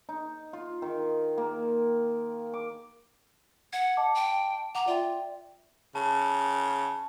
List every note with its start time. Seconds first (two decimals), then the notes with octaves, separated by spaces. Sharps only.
0.09 D#4
0.53 F4
0.82 D#3
1.38 A#3
2.53 D6
3.73 F#5 G#6
3.97 D#5 A5 D6
4.15 G5
4.75 F#5 A#5 D6
4.87 F4 D5 E5 G5
5.95 C#3 A5